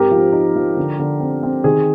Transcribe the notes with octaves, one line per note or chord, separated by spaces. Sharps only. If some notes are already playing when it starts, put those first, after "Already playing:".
Already playing: G#2 C4 G4 A#4
F3
D#4
F3
D3
D3
C4
C4
D#3 G#4